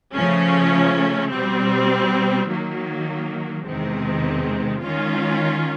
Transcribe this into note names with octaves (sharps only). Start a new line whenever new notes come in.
C#3 F3 A3 C#4
B2 G3 C4
D#3 F#3 A#3
E2 C3 D#3 G#3 C4
D#3 G#3 C#4 F4